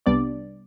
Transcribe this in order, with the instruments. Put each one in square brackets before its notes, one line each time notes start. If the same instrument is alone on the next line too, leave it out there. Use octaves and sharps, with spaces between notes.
[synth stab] C2 C3 G3 B3 D4 D5